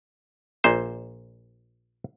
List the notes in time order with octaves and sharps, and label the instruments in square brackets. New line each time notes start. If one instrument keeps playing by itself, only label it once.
[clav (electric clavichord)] A#1 A#2 C5